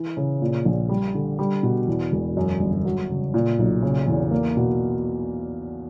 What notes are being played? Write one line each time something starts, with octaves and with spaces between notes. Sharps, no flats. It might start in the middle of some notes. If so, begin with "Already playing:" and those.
Already playing: E3
C#3
A#2
A#1
G3
D3
G3
B2
E2
E1
F#2
G1
F#3
C#3
A#2
B1
C#3
E2
A#3
B2